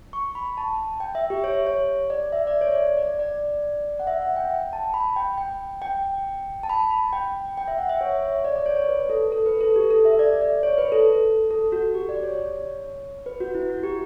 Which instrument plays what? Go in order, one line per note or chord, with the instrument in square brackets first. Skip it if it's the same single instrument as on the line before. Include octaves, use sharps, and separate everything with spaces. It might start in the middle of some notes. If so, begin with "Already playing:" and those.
[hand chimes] C#6
B5
A5
G5
E5
G4
C#5
C#5
D5
E5
D5
C#5
D5
D5
D5
F#5
E5
F#5
G5
G5
A5
B5
G5
G5
G5
A5
B5
B5
G5
G5
E5
F#5
E5
C#5
C#5
D5
D5
C#5
C#5
B4
A4
A4
B4
A4
G4
A4
E5
D5
D5
C#5
B4
A4
A4
F#4
G4
D5
C#5
B4
F#4
E4
F#4
G4